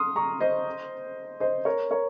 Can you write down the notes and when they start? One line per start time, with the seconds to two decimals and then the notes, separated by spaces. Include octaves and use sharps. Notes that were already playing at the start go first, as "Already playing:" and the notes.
Already playing: C6 D#6 F6
0.16 A#5 C#6
0.41 C5 D#5
1.40 C5 D#5
1.65 A#4 C#5
1.91 A#4 C#5